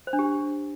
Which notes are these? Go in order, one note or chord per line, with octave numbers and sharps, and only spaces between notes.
C5
D4
G4